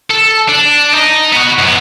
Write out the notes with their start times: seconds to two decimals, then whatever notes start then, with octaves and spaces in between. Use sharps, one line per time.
0.11 A4
0.49 D4
0.94 D#4 D#5
1.33 B3 F#4
1.59 F#2 B3